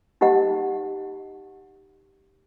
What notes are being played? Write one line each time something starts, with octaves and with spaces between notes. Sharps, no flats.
D#4 G4 D#5 F#5